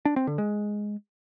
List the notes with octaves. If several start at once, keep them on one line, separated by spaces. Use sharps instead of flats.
D4
C4
D3
G#3